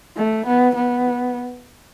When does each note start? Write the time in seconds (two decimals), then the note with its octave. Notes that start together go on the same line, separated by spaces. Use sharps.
0.16 A3
0.46 B3
0.75 B3